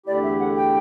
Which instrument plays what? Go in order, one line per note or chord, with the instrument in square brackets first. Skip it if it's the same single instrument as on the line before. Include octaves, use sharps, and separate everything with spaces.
[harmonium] E2 D3 A3 E4 G4 [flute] D5
[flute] E5
F#5
G5